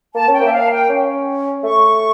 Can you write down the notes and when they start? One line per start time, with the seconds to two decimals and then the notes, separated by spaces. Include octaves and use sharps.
0.14 A#3 A5
0.28 C#4
0.34 G5
0.41 A#3 E5
0.52 F5
0.65 A5
0.71 G5
0.89 C#4
1.64 A3 C#6